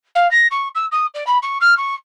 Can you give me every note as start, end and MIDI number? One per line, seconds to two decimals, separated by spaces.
0.15 0.30 77
0.31 0.47 94
0.51 0.68 85
0.75 0.86 88
0.91 1.06 87
1.14 1.26 74
1.26 1.38 83
1.42 1.58 85
1.61 1.76 89
1.77 1.94 85